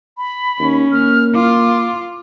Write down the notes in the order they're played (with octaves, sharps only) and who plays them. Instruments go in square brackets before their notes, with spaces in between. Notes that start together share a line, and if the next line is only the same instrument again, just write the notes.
[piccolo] B5
[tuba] D#2 [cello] C#4
[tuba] A#3 [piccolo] F6
[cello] F4 [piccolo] D6